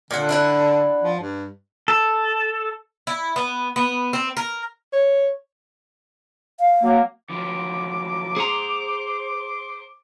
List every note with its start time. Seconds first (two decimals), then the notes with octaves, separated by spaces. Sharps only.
0.11 A#2 D3 F#5
0.29 D4 E4 F#5
1.02 F3
1.20 G2
1.88 A4
3.07 E4
3.36 B3
3.76 B3
4.13 C4
4.37 A#4
4.93 C#5
6.60 F5
6.83 F#3 A#3
7.30 D#3 F3 F#3 D6
8.37 G#4 C5 F#5 A#5